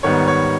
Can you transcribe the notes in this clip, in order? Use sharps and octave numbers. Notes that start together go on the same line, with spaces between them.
G#2 D#3 G3 B3 C#5
C#5